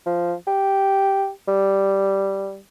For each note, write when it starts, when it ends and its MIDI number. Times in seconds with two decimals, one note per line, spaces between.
0.06 0.34 53
0.47 1.30 67
1.48 2.59 55